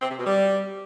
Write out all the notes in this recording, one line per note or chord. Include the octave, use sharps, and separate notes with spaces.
C4
C3
B2
G3